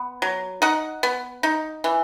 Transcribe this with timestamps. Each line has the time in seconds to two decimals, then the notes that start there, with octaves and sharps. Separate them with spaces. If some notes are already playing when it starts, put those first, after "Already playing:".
Already playing: B3
0.22 F#3
0.62 D#4 F#5
1.03 B3
1.43 D#4
1.84 E3